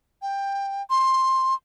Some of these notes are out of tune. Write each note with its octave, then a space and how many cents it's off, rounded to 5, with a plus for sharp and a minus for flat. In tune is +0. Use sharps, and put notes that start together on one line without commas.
G5 +15
C6 +10